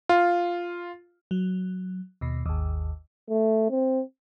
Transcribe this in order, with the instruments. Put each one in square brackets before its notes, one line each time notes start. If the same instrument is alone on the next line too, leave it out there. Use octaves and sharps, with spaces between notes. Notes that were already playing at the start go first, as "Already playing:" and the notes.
[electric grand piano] F4
[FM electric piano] F#3
D#2 B2
G#1 D#2
[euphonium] A3
C4